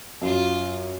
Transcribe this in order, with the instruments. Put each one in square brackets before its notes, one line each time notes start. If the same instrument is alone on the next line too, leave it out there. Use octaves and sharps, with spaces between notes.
[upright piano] F#2 [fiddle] F4